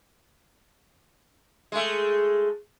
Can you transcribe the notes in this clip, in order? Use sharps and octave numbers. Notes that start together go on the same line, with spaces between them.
G#3 A3